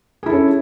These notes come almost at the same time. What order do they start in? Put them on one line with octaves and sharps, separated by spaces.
G#4 E4 A4 C#4